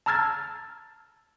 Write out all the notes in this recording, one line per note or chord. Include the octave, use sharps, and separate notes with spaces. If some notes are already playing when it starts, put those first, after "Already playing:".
A5 A#5 E6 F6 G#6 A6